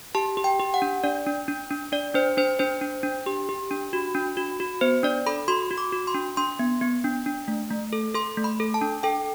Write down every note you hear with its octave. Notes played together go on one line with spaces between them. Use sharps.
G4 A5
G4
G5
G4
F#5
D4
D4 D5
D4
D4
D4
D4 D5
D4 C5
D4 C5
D4 C5
D4
D4
G4
G4
D4
F#4
D4
F#4
F#4
B3 C5
D4 D5
A4 B5
F#4 C6
F#4
D6
F#4
C6
D4
D4 C6
B3
B3
D4
D4
A3
A3
A4
A4 C6
A3
B5
A4
A5
D4
A4 G5